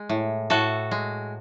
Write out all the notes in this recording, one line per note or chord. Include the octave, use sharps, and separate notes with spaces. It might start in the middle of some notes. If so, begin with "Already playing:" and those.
Already playing: G#3
A2
A2 F#4 A4
G#3